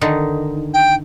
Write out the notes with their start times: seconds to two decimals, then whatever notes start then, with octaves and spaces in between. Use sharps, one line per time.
0.01 D3 D#3 D#4
0.74 G5